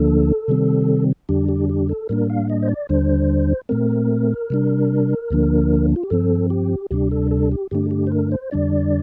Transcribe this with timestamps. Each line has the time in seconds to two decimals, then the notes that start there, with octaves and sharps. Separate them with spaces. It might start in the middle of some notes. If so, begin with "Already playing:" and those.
Already playing: D2 D3 F3 A#3 D4 A4
0.48 C3 D#3 G3 C4
1.29 F2 D3 G3 D4 G4
1.49 G4
1.69 G4
1.89 A4
2.09 A2 G3 A#3 D4 A#4
2.29 F5
2.50 D#5
2.63 C5
2.69 D5
2.89 D#2 D3 G3 D4 C5
3.69 A#2 A3 C4 A#4
4.50 C3 G3 D4
5.30 D2 D3 F3 A#3 D4
5.96 F4
6.03 G4
6.10 G2 F3 C4 A4
6.50 G4
6.91 D2 C3 G3 D4 G4
7.11 A4
7.31 A4
7.52 G4
7.71 G2 D3 A3 D4 G4
7.91 G4
8.07 C5
8.11 A#4
8.32 C5
8.51 F2 D3 G3 D4 D5